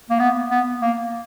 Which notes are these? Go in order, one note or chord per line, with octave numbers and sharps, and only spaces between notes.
A#3
B3
B3
A#3